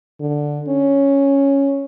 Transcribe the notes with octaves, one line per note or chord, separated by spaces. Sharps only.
D3
C#4